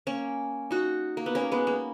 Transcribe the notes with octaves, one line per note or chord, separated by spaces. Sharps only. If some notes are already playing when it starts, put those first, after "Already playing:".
A#3 C#4
D#4 F#4
A#3
B3
A#3 C#4
G#3 B3
A#3